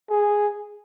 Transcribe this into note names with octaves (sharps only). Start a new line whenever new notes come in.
G#4